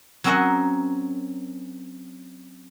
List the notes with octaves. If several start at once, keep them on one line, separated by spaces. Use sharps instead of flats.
F#3 C4 C#4 A#4 D#5 F#5